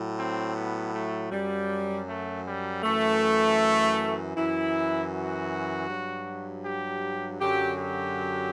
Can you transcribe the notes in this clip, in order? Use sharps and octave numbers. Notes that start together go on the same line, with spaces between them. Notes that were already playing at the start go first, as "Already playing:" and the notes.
Already playing: A2 F#3
C4
B3
A3
F#2 F#3 G3
A3
G3
F#2 E3 A3
F#2 E3 E4
F#4
G2 F#3
G4
F#2 D3 F#3 G4
G4